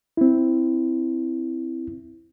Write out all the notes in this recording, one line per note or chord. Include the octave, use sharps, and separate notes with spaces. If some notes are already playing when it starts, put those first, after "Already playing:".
C4 E4